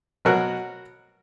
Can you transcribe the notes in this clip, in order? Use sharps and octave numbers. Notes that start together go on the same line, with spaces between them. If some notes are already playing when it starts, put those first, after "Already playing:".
B2 F#3 F#4 A#4